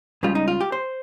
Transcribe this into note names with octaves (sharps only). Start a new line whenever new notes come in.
C#2 C#3 G3 F4
D#4
F4
G4
C5